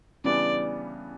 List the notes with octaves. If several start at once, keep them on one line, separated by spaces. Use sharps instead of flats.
C#3 E3 G3 B3 D4 D5